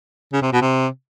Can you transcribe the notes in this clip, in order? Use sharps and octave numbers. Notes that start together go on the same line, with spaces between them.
C#3
C3
B2
C3